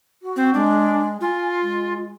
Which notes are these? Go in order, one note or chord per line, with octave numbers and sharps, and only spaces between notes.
F#4
C4
G#3 D4
F4 G#5
G#3